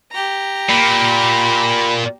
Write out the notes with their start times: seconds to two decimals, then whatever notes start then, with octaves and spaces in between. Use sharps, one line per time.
0.12 G4 A#5
0.69 A#2 B5